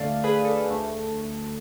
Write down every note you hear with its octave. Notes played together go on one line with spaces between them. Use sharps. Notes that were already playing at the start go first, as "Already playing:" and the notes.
Already playing: D2 D3 A3 D5 F5
G#4 B4
A4
D2 D3 A3